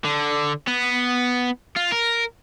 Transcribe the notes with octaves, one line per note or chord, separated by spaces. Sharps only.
D3
B3
F4
A#4